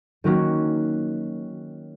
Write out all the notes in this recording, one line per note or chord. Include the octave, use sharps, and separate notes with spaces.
D#3 F#3 A#3 C#4 F#4